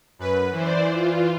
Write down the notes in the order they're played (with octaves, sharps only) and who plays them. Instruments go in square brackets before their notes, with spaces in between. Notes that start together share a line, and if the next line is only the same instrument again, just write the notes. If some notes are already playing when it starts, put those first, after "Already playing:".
[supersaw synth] F#2 B4
[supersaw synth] E3 [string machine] C5 D5
[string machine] F4